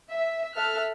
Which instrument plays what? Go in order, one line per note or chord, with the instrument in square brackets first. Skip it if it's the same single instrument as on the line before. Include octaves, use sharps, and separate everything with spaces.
[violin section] E5
A4 E5 F6 F#6